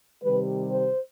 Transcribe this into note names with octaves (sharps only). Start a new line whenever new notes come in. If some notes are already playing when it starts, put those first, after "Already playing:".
C3 D#3 G3 B4
C5